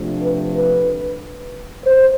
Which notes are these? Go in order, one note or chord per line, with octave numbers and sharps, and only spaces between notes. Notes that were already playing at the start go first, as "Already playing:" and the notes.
Already playing: C3 F3 A3 D4
B4
B4
C5